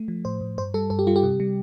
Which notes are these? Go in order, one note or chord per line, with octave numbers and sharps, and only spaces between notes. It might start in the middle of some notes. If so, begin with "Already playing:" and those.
Already playing: A3
F3
A2 C5
A2
G2 C5
G3 A4
G2 A4
G4
G3 F4
G4
C3
G3